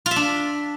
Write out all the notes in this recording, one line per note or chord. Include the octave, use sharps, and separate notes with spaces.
F4
E5
D4